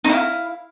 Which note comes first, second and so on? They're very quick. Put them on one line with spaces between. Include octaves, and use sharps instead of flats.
D#4 E4 F5